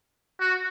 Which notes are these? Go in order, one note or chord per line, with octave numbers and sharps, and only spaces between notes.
F#4